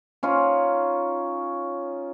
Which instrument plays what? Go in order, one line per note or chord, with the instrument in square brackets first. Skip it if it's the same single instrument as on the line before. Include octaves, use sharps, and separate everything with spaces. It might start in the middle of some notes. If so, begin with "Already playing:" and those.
[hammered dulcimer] C#4 D#4 F4